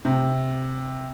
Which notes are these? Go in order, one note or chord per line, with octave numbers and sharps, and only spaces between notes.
C3